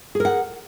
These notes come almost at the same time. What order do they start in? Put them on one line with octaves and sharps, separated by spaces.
G#4 A#4 F#5